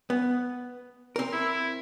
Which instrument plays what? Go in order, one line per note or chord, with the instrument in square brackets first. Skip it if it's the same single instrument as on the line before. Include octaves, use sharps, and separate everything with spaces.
[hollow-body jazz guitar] B3
C4 A#4
[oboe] E4